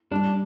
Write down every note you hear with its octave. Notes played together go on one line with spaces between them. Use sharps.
G3 D4